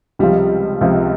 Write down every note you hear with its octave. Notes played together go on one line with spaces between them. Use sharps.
C#2 C3 F3 G3
C#2 C3 F3